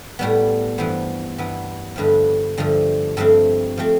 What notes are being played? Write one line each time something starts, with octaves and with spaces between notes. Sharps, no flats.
A2 G3 B3
G2 E3 B3 C5
G2 E3 B3
G2 D3 F3 A3 B4
G2 D3 F3 A3
G2 F3 A3 C4 A4
F3 A3 C4